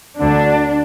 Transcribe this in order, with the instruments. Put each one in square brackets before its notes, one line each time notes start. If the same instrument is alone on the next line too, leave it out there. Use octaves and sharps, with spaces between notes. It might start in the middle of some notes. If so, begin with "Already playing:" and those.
[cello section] D2 D3 D4